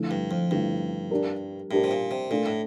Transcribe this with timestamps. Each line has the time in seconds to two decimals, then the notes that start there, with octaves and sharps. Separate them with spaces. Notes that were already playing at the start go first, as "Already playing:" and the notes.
Already playing: D3 F3 A3 E4
0.11 G2
0.31 F2
0.51 G2 D3 F3 A3 E4
1.11 G3 D4 G4 A#4
1.71 A2 G3 D4 G4 A#4
1.84 C3
1.91 A#2
2.11 C3
2.31 A#2 A3 D4 A4
2.46 A2